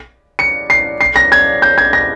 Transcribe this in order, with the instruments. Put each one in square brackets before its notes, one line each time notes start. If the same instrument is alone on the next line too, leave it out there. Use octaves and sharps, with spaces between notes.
[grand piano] C#7
C7
C7
A#6
G#6
G6
G#6
A#6